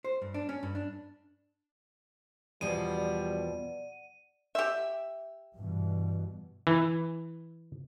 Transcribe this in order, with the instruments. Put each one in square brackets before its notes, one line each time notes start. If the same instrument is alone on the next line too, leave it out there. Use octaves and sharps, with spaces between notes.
[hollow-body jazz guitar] C5
G2
D4
C#4
G2
D4
[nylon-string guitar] E2 B2 F3 [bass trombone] G3 [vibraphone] D5 F#5 [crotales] D#7
[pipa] G4 E5
[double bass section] G2 B2 E3
[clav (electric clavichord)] E3